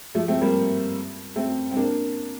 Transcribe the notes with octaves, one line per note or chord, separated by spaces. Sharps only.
F3 A3
A3 C4
G3 A#3
A3 C4
C4
A#3 D4